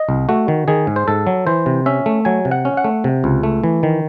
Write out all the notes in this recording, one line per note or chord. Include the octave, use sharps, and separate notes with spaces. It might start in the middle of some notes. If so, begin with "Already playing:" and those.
Already playing: D#5
C2
A3 F#4
D#3
D#3 G#4
G#2
C5
G#2 A4
F#3
E3 C5
C3
C#4 E5
A3
F#3 G#5
C3
F#5
C#4
F#5
A3
C3
C#2
A3
E3
D#3